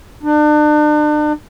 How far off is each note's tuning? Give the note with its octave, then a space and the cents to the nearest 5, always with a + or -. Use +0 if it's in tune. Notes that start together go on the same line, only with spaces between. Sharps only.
D4 +40